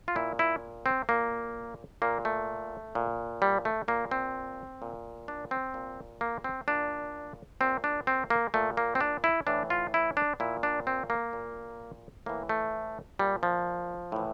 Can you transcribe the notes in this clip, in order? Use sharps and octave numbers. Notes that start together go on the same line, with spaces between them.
F4
A#2 E4
E4
C4
A#2 A#3
A#2 A#3
A3
A#2
G3
A3
A#2 A#3
C4
A#2
D4
C4
A#2
A#3
C4
A#2 D4
A#2 C4
D4
C4
A#3
A#2 A3
A#3
C4
D4
E4
A2 E3 D4
F4
E4
D4
A#2 E4
D4
C4
A#3
A#2
A2 E3 A#3
A3
A#2 G3
F3
A2 E3